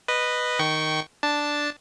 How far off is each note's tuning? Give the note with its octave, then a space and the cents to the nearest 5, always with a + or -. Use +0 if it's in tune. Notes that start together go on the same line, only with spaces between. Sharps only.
B4 +0 D#5 -15
D#3 +0 G5 -20 C#6 +0
D4 +0 A5 +0